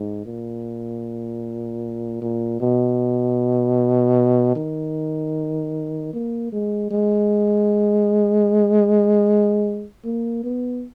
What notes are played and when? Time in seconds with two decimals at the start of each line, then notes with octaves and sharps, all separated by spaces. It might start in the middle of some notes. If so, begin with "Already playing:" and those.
Already playing: G#2
0.26 A#2
2.22 A#2
2.60 B2
4.56 D#3
6.13 A#3
6.52 G#3
6.91 G#3
10.04 A#3
10.44 B3